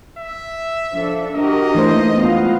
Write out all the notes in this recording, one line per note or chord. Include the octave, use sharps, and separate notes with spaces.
E5
F3 D4 A4
D4 F#4 G4 A#4 D#5
E3 A3 A#3 D#4 C5
F2 G#3 B3 F4 F5